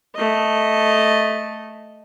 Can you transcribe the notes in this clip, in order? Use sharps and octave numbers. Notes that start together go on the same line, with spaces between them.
A3 D#5